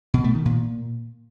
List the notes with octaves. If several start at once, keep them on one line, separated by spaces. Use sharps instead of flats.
B2
A3
D#3
A#2